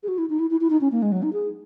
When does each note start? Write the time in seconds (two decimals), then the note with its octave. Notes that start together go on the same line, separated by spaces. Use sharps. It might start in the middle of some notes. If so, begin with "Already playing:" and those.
0.03 G#4
0.08 F#4
0.18 E4
0.29 D#4
0.39 E4
0.51 E4
0.61 E4
0.70 D#4
0.81 C#4
0.92 A#3
1.02 G#3
1.12 F#3
1.23 D#4
1.33 G#4